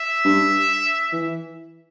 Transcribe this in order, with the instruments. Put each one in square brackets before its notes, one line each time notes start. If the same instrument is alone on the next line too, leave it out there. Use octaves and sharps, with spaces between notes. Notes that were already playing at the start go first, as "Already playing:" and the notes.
Already playing: [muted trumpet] E5
[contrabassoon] G2
E3